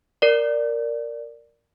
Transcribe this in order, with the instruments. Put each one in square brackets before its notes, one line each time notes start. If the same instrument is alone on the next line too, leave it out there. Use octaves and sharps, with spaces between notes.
[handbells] A#4 D5